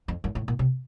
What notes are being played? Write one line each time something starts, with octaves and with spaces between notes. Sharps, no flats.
F2
F#2
A2
A#2
C3